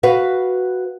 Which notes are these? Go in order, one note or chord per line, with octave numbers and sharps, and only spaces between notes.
F#4 B4 F5